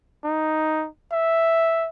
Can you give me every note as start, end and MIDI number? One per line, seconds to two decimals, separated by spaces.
0.24 0.88 63
1.12 1.89 76